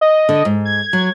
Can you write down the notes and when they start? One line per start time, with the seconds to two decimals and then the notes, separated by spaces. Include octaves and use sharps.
0.01 D#5
0.29 D3
0.45 G#2
0.65 G#6
0.93 F#3